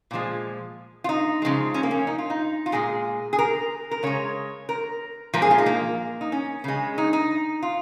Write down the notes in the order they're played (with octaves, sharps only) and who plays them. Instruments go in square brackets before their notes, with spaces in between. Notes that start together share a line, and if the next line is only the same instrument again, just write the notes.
[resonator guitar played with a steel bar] A#2 F3 G#3
F4
D#4
C#3 F3 G#3
C#4
A#3
C#4
D#4
F4
D#4
F4
A#2 G#3 G#4
G#4
A#4
A#4
C#3 G#3 C#5
A#4
A#2 F3 G#3 A#4
G#4
F4
D#4
A#3
D#4
C#4
C#3 G#3
D#4
D#4
F4